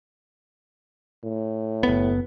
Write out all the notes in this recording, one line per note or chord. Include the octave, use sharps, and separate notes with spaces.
A2
F#1 B3